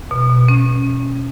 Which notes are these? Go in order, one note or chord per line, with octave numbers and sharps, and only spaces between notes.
B2
B2
C#4